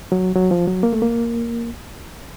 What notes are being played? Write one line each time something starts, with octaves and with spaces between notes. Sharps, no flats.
F#3
F#3
F3
F#3
A#3
A3
A#3